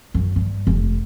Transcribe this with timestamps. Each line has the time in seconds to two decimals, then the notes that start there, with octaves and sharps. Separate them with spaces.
0.14 F#2
0.36 G2
0.67 F1